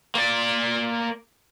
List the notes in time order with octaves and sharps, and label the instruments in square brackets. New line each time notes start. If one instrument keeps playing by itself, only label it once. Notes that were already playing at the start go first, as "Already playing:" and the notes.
[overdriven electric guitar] A#3 D5